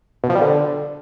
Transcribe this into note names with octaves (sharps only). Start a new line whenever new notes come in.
B2
F3
G3
D3